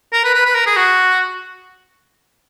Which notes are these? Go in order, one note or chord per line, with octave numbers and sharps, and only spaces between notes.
A#4
B4
B4
B4
A#4
G#4
F#4